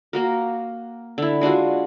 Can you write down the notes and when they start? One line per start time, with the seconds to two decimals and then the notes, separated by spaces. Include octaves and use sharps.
0.13 A#3 F#4 A#4
1.18 D3 E4
1.41 G#3 D4 F4 F#4